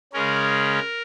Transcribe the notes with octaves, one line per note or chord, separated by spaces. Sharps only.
C#3 G#3 C#4 A#4